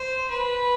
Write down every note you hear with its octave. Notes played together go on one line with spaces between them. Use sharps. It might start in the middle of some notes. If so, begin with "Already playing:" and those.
Already playing: C5
B4